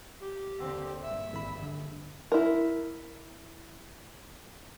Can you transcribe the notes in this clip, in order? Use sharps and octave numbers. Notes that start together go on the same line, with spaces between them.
G4
D#2 D3 C4
A#1 G2 E5
G#1 B5
D3
E4 A#4